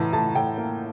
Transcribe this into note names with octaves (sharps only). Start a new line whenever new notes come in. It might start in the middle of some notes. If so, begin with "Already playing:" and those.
Already playing: A2 E3 A5 A#5
A2 A5
A2 G5
A#3